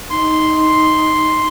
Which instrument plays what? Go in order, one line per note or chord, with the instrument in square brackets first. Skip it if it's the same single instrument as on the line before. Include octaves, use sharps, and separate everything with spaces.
[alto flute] D#4 [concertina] C6